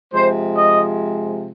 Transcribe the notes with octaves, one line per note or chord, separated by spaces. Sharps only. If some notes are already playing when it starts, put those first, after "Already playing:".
C3 F3 G#3 C5
D#5